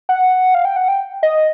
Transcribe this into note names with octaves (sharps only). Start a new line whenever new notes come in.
F#5
F5
G5
F#5
G5
D#5